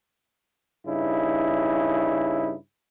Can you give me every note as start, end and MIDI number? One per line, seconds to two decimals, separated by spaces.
0.86 2.54 43
0.86 2.54 49
0.86 2.54 63
0.86 2.54 64